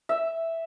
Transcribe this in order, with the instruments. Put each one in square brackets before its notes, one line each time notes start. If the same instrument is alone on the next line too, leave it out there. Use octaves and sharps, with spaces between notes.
[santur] E5